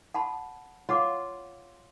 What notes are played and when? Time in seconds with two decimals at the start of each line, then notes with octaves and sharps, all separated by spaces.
0.14 F#5 A5 B5
0.89 F4 C#5 F#5 D6